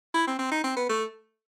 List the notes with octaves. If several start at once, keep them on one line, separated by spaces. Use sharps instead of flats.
E4
C4
C4
D#4
C4
B3
A3